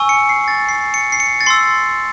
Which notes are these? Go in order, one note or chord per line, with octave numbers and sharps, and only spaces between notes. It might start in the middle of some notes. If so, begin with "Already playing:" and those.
Already playing: G#5 C#6 E6
C#7
C7
A6
C7
C#7
C7
C#7
A6
C6 E6 C7